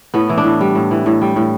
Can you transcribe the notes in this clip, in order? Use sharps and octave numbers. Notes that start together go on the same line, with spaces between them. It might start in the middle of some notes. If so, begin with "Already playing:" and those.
A2 B3
E3
D4
A2
G3
A2
E3
A2
G3
A2